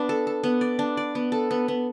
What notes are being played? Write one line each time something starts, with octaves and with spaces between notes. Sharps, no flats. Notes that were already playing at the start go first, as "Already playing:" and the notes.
Already playing: B3 D4
A4
A4
B3
D5
D4
D5
B3
A4
B3
B3